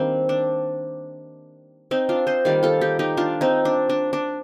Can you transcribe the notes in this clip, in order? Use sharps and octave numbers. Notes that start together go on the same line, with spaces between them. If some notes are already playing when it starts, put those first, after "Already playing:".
Already playing: D#3 G3 A#3 C4 D4
D4
C4 D#4
D4 F4
C5 D#5
D#3 G3 A#3 D5 F5
F4 A4
D#4 G4
D#4 G4
D4 F4
C4 D#4
D4
D4
D4